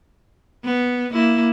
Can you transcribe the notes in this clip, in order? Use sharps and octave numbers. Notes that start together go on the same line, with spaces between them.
B3
A#3 E4